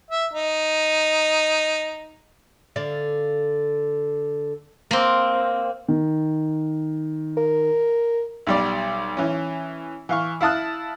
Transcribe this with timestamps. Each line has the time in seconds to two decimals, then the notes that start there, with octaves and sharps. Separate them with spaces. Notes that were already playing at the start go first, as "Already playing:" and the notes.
0.11 E5
0.33 D#4
2.76 D3 D5 F5
4.91 A#3 C4
5.88 D#3
7.37 A#4
8.47 B1 G3 D5
9.17 E3 C#4
10.09 E3 F5 C#6
10.41 E4 F5 A5 D#6 F#6